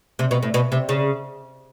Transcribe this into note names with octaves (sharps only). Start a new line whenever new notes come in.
C3
B2
A2
B2
C3
C#3